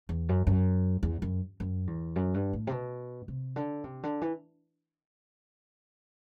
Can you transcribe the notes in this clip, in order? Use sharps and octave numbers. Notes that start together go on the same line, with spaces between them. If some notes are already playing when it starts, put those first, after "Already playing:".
E2
F#2
F#2
E2
F#2
F#2
E2
F#2
G2
A2
C3
B2
C3
D3
C3
D3
E3